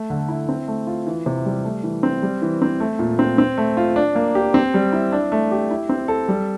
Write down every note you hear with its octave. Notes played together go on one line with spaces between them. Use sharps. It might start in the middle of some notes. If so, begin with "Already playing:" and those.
Already playing: A3
D3
E4
C4
A3
F4
E3
C3
G3
A3
E3
C4
G3
E3
C4
A3
A#2
C4
C4
A3
F4
D4
A#3
G4
C4
G3
E4
D4
A3
G4
E4
C4
A4
G3